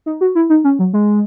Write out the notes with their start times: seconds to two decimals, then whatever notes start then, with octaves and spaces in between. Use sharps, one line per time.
0.06 D#4
0.21 F#4
0.35 E4
0.50 D#4
0.64 C#4
0.79 F#3
0.93 G#3